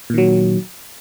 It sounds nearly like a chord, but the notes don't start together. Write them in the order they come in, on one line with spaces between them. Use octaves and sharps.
A#2 D#3 F#3